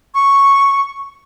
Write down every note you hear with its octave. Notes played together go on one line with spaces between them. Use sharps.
C#6